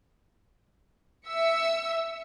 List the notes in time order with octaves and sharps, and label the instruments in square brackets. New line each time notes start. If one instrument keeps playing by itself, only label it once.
[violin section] E5 E6 C#7